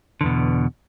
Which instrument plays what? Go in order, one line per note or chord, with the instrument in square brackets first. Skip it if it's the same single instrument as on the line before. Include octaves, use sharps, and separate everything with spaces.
[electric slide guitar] D3
E2
B2